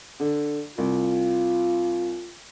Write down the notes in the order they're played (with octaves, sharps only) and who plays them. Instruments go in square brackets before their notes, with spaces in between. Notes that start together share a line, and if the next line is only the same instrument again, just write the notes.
[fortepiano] D3
[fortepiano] C2 [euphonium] F4